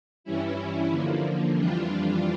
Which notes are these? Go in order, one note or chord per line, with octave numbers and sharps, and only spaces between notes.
G2 E3 G3 C#4 E4
D3 F3 A#3
F2 E3 G3 D4 F4